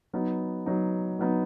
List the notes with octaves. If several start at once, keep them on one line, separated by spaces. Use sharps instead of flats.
F#3 B3 D#4
F#3 B3 D#4
F#3 B3 D#4